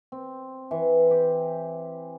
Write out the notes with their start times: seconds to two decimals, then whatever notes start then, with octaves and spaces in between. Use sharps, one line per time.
0.12 C4
0.71 E3
1.11 G4